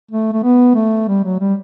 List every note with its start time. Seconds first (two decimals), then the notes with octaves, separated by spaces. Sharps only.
0.11 A3
0.33 A3
0.43 B3
0.75 A3
1.08 G3
1.24 F#3
1.39 G3